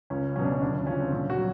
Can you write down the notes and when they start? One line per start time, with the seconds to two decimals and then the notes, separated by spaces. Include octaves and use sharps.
0.10 C#2 C#4
0.36 B2 F#3 C#4
0.44 D4
0.52 C#4
0.61 D2 D4
0.74 C#4
0.87 C#3 F3 C#4
1.00 C4
1.12 A#1 C#4
1.30 F#4
1.38 F#3